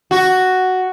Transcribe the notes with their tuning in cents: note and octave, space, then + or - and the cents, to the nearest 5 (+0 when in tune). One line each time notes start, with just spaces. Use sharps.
F#4 +5